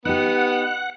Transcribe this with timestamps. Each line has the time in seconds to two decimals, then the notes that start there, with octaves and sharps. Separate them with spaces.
0.05 B3 D#4 G4 F#5